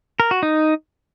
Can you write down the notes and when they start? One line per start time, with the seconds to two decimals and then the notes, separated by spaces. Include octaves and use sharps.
0.20 A#4
0.31 F#4
0.43 D#4